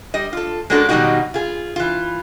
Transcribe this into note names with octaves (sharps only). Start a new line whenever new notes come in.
G3 D#5
F4 A4
G#3 A#3 C#4 D4 F#4 A4
B2 D#3 F#3 G3 D#4 F#4
F4 G#4
E3 F4